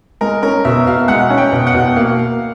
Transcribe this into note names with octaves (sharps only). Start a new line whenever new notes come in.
G#3 A#4
C#4 A#4
B2 E5
B2 F5
G#3 F#5
C#4
G5
B2
F#5
B2
A#3 F5